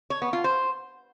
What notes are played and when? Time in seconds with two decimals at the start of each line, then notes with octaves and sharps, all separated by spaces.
0.10 C#5
0.22 B3
0.33 F4
0.44 C5